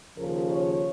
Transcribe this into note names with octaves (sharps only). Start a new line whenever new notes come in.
D#2 C#3 F3 A#4
C#5